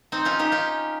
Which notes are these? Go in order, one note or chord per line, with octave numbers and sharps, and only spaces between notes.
C4 D#4
C#4 F4
D#4 G4
C#4 F4